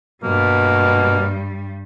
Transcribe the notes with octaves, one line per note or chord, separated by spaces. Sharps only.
G2 B2 G3 A#3